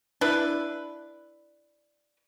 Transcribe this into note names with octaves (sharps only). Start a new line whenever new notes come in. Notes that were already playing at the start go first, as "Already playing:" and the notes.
D4 E4 B4